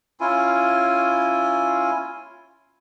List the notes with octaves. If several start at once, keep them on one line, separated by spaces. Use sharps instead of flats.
C#4 E4 F4 G#5